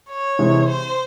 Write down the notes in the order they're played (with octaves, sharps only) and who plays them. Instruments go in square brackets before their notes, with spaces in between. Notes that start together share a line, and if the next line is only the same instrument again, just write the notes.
[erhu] C#5
[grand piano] C3 E3 G#3
[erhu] C5